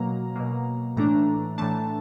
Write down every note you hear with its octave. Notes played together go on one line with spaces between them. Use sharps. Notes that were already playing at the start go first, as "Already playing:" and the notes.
Already playing: B2 F#3 A#3 A#5
B2 F#3 A#3
A2 E3 A3 D4 A#5
A2 E3 A3 D4 A5